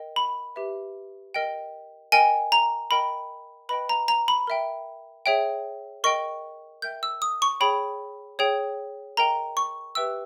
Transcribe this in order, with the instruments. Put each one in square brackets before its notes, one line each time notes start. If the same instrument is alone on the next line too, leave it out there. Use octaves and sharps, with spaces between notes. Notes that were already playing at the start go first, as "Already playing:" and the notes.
Already playing: [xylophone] A#4 D#5 G5
B5
G4 B4 E5
A#4 D#5 G5
A#4 D#5 G5 G#5
A#5
A#4 D#5 G5 B5
B4 D#5 G5 B5
A#5
A#5
B5
A#4 E5 G5
G#4 C#5 E5 G5
A#4 D#5 G5 C#6
A#4 E5 G5 G6
E6
D#6
C#6
G#4 C#5 G5 B5
G#4 C#5 G5
A#4 D#5 G5 A#5
C#6
G4 B4 E5 G5 E6